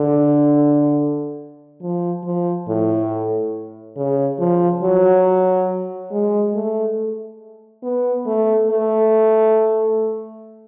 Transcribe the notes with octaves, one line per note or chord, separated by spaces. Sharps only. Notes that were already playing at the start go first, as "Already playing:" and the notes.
Already playing: D3
F3
F3
A2
C#3
F3
F#3
G#3
A3
B3
A3
A3